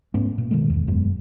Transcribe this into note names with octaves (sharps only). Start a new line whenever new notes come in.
G#2 A3 B3 C#4
A#2
B2 D#3 G#3 A3
A1 E2
E1 F#2 G#3 B3